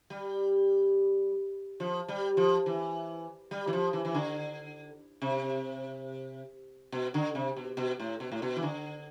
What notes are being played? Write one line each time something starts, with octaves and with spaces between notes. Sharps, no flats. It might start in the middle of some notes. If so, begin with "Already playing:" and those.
G3
F3
G3
F3
E3
G3
E3
F3
E3
E3
D3
C3
B2
D3
C3
B2
B2
A2
B2
A2
B2
E3
D3